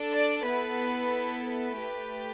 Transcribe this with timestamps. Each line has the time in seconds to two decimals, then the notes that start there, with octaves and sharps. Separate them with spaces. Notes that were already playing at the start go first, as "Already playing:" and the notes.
Already playing: D4 A4
0.15 D5
0.46 B3 E4 A4 B4
1.47 B4
1.79 A3 G4